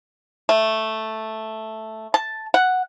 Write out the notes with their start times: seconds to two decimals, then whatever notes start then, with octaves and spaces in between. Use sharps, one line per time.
0.49 A3
2.14 A5
2.54 F#5